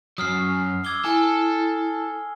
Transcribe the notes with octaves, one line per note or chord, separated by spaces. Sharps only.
F#2 F#3 D#6 F6 C7
D6 E6 G#6 G7
E4 A4 G#5